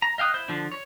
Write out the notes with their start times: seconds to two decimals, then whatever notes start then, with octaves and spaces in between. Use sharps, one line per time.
0.02 A#5
0.18 D#5 F5 G5 D#6 F#6
0.34 E4 C5 G6
0.48 D3 F3 D4
0.72 C#5